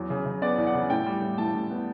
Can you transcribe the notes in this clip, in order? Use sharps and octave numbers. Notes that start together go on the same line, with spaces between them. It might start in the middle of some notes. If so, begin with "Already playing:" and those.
Already playing: E2 F#3
C#3
C#3
B3 D5
E2
F#5
C#3
A2 G5
G3
A2
A2 A5
A2
B3